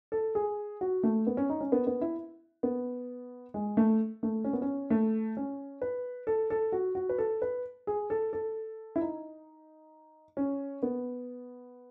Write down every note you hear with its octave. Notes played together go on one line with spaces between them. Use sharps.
A4
G#4
F#4
A3
B3
C#4
D#4
C#4
B3
B3
E4
B3
G#3
A3
A3
C#4
B3
C#4
A3
C#4
B4
A4
A4
F#4
F#4
B4
A4
B4
G#4
A4
A4
E4
D#4
C#4
B3